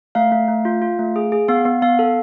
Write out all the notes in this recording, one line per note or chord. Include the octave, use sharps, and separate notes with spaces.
A3 F5
A3
A3
F4
F4
A3
G#4
G#4
B3 F5
B3
B3 F5
A4